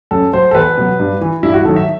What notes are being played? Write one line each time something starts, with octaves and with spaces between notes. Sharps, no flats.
F#2 A4
F#3 C5
A4
E2 B4
B2 F#3
G2
E3
G2 E4
F#4
D#3 F#3 A4
E5